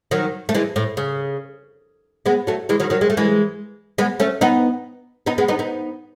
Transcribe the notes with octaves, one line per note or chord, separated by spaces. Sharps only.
D#3 F#3
A3
E3 G#3
A2
C#3
G#3 B3
F#3 A3
E3 G#3
D#3 F#3
D#3 F#3
G#3
A3
E3 G#3
G#3 B3
A3 C#4
B3 D#4
B3 D#4
G#3 B3
B3 D#4
B3 D#4